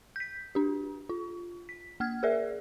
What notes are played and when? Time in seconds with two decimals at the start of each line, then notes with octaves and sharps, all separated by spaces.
0.16 G6 B6
0.55 D4 G4
1.09 F4
1.69 B6
2.00 A#3 F6 G#6
2.23 G#4 A#4 D5 E5